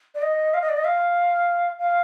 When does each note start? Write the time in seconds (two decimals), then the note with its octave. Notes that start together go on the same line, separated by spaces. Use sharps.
0.15 D5
0.22 D#5
0.54 F5
0.62 D#5
0.69 D5
0.77 D#5
0.85 F5
1.79 F5